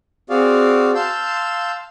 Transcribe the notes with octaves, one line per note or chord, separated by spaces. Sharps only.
C4 F#4 G#4 D5 F5
F5 A5 C6 E6 G6